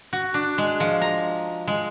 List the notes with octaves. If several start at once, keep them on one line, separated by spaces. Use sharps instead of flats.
F#4
D4
G#3
F3
A#5
G#3